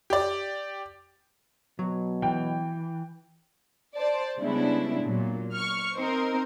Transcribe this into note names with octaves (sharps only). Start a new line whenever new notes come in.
G4 D5
B2 F#3
E3 G5
C5 D5 A5
C#3 G3 G#3 B3 D4 E4
A#2 F#3
C#6 F6
C4 D#4 A#4 C5